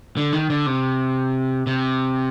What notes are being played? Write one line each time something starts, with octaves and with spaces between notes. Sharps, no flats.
D3
D#3
D3
C3
C3